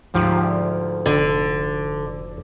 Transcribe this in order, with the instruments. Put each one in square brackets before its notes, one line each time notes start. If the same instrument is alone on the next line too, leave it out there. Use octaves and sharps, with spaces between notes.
[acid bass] D2 [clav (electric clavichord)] G#2 F3 G4
[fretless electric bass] F1 [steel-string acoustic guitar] D3